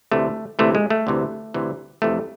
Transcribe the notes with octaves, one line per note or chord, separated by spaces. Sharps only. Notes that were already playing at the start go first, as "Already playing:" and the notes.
D2 C3 E3 A3
D2 C3 E3 A3
G#3
A3
D2 C3 E3
D2 C3 E3
F2 C3 E3 A3